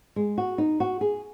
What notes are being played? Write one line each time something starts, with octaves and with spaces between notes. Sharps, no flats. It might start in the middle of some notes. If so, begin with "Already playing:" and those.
G#3
F#4
D#4
F#4
G#4